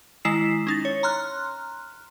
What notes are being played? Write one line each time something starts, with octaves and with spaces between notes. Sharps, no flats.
D#3 G#3 E4 B6 C7 E7
C#4 D#4 A6
C#5
A#5 C6 F6 F#6